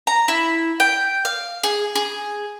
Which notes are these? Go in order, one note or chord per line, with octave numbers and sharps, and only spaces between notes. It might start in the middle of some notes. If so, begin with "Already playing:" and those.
A#5
E4
G5
F5
G#4
G#4